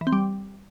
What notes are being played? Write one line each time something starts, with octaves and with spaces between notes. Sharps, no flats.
E3
C4
G3